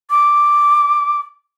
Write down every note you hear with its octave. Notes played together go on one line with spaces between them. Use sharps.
D6